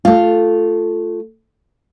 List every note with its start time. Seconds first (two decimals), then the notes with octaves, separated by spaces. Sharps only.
0.05 A3 F4